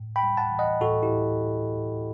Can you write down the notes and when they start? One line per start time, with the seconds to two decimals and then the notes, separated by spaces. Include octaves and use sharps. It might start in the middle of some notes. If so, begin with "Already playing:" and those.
Already playing: A2
0.16 G5 B5
0.23 G3
0.37 F#5 A5
0.52 E3
0.59 D#5 F#5
0.81 A2 F#4 A4
1.03 E4 G4
1.10 A2